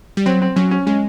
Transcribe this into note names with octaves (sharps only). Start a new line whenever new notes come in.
G3
F#3 C4
C4
F#3 C#4
C#4
G#3 C#4